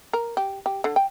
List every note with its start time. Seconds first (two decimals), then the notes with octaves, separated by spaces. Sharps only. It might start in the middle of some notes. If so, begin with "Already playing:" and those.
0.13 A#4
0.37 G4
0.66 G4
0.84 D3
0.96 G5